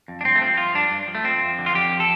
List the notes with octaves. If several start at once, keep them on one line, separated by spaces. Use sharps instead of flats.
F2
D4
G2 C4
A3
F3 C4
F3 F4
G2 D4
G2
F3
A3
F3 C4
F2
D3
F4
F2 G4
F3
A4